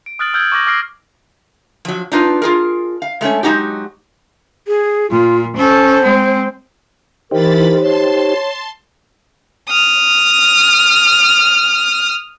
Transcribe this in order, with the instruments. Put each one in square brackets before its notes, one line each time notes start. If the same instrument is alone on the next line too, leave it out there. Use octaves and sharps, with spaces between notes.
[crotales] D7
D#6 F6 F#6 A6 D7 F#7
E6 F6 G6 G#6 F#7
C#6 D6 A#6 F#7
D6 E6 F6 A#6 C7 D7
[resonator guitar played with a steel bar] F3 F#3
D4 D#4 F4 B4
F4 G#4 A#4
F5
G#3 A3 C#4 C#5
F#3 G#3 D#4 F#4 G4
[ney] G#4
[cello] A#2 [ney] F4
[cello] C#4 A4 [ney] C5
[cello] G#3 C4
[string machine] E3 B5 A6 [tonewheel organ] D#4 G4 C5 [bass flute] A#4
[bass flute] C#5 [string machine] A5 C6
[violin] D#6 F6